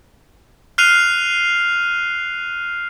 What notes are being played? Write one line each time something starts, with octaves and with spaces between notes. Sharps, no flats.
F6 F#6 C7 D#7 F7